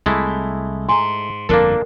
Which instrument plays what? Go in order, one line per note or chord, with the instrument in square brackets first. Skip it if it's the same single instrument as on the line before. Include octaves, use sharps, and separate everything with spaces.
[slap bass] C2 [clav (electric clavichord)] G#3 A3 E4
[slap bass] G#2 [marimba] G#5 A#5 [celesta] C6
[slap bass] G1 F2 F3 [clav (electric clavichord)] A#3 D4 A4 [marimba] A#4